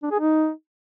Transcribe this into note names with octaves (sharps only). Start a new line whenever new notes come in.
D4
G#4
D#4